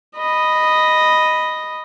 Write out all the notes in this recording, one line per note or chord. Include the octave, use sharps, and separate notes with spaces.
D#5 B5